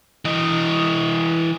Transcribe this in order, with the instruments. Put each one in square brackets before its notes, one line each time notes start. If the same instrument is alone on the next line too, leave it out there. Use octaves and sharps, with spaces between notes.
[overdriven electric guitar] E3 D#5